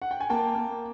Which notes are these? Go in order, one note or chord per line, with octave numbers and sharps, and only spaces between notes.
F#5
G5
G#5
A#3 G5 A5
A#3